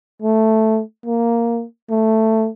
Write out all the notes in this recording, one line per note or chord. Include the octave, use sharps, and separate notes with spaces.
A3
A#3
A3